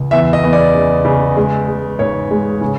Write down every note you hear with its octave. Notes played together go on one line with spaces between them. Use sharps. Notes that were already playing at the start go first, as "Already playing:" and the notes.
Already playing: C#2
E2 E5
D#5
E2
D5
C#3
C#3
G#3
G#3
G#2 C#5
G#3
C#3